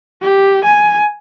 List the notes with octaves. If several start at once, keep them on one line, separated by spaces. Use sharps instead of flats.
G4
G#5